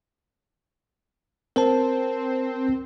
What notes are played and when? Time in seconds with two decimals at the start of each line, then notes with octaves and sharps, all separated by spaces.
1.56 C4 A#4 C5 A5